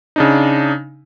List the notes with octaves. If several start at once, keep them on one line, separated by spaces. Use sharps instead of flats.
C#3 D4 D#4